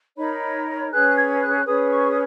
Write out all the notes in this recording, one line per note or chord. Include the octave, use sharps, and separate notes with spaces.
D#4 A#4 C#5 B5
C#4 G#4 B4 F#6
G#6
F#6
C#4 G#4 B4 D#6
C#6
D#6